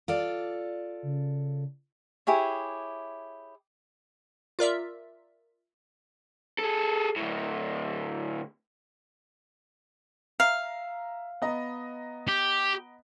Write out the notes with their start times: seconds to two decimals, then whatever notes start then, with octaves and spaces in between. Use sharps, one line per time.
0.08 F4 A4 D5
1.03 C#3
2.27 E4 G4 G#4 C#5
4.59 F4 A#4 D5 E5
6.59 G#4 A4
7.16 D2 A2
10.40 E5 F5 A#5
11.42 B3 D#5 A#5
12.28 G4